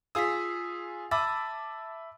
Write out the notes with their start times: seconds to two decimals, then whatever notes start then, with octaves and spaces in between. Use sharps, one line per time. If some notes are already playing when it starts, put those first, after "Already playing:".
0.15 F4 G#4 D#6 E6 B6
1.11 E5 A5 B5 D6 E6 A6